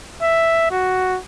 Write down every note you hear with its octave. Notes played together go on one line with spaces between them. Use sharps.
E5
F#4